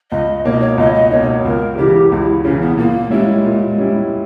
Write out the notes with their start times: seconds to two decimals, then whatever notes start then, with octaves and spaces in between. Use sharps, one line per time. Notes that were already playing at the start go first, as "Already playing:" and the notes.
0.11 C#2 D#5
0.45 B2 A#3 D#4 C#5
0.52 D#5
0.60 C#5
0.78 C#2 D#5
0.94 D#5
1.11 B2 A#3 D#4 C#5
1.45 C#2 A#4
1.77 C#3 E3 G4
2.12 C#2 E4
2.45 C#3 E3 C#4
2.61 B3
2.77 A#2 A#3
3.10 G3 G#3 C#4 E4
3.45 A#2
3.78 G3 C#4 E4